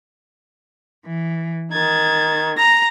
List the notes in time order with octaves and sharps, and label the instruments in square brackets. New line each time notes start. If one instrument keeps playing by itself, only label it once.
[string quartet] E3
[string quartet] D#3 [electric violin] G#6 A6
[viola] A#5 [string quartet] A#6